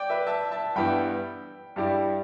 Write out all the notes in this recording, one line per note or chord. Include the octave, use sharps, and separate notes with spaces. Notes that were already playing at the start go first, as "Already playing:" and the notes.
Already playing: D5 G5
B4 E5
E5 A5
E5 A5
G2 E3 G3 B3 E4 G5 B5
G2 G3 E4 G4 D5